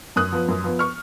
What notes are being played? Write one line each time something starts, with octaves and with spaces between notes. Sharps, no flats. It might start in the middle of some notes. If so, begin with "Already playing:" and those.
F#2 D#6 F#6
F3 B3
F#2
F3 B3
C#6 F6